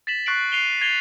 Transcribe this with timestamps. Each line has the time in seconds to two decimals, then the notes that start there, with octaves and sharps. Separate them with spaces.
0.07 A6 B6 E7 F#7
0.26 C#6 F#6 A6 C7 D7 F#7
0.52 C7 D#7 F7 G7
0.81 G#6 A6 C7 D#7 F7 G7